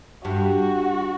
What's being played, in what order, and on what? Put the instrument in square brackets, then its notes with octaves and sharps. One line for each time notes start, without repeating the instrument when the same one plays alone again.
[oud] G2 [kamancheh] F#4